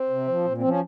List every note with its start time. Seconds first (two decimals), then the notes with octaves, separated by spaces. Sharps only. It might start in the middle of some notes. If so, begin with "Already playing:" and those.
Already playing: C4
0.10 C3
0.28 F3
0.45 A#2
0.58 C4
0.63 F3
0.68 C#4